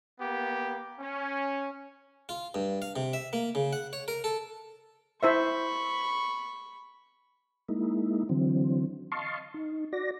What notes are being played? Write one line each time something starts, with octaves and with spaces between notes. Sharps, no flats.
A#3 B3 G4
C#4
F4
G2
F5
C3
E5
A#3
C#3
F#5
C#5
A#4
A4
E4 C5 E5 B5 C#6
G#3 A#3 D#4 E4
D3 E3 F#3 C4
D#5 F5 A5 C6 C#6
D#4
F#4 D5 A#6